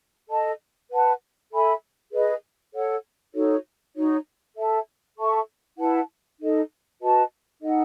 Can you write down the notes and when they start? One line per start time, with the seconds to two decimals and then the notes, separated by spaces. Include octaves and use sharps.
0.29 A4 D#5 A5
0.90 B4 F#5 A5
1.52 A4 E5 G#5 B5
2.12 G#4 B4 D#5
2.74 A4 C#5 F#5
3.34 D#4 F#4 A4 C#5
3.95 D#4 F#4 C#5
4.57 A4 E5 A5
5.18 A4 E5 A5 C#6
5.78 E4 B4 F#5 A5
6.40 D#4 A4 D#5
7.01 F#4 B4 D#5 A5
7.62 D#4 A4 D#5 F#5